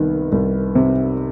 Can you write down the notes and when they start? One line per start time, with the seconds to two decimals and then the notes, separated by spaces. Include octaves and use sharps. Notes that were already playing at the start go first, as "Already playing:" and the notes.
Already playing: C2 D#3 B3
0.32 C2
0.75 C3